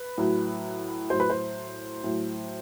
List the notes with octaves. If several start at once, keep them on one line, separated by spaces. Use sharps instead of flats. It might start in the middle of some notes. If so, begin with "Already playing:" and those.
Already playing: B4
A2 F#3
A2 F#3 C5
B4
C5
A2 F#3